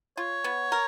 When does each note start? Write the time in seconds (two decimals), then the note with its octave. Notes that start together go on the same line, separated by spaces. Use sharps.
0.17 F4 C#5
0.44 B3
0.72 A#4